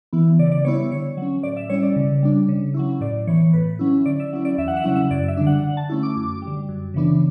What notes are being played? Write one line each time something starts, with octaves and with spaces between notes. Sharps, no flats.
E3 B3 E4
C#3 D5
D5
G3 B3 E4 C#5
D3 C#5
F#3 C#4
A2 D5
E5
G3 C#4 E4 C#5
D5
C#3
G3 D4
C#3
F#3 C#4 E4
A2 D5
E3 B3 C#5
A2 B4
F#3 C#4 E4
D3 D5
E5
F#3 C#4 E4
D5
E2 E5
F#5
E5
C#3 F#3 C#4 E4 F#5
E5
F#2 D5
E5
D3 G3 D4
F#5
D3 F#5
A5
A3 C#4 E4
D6
F#2
G3
D3
F#2
C#3 E3 B3 D4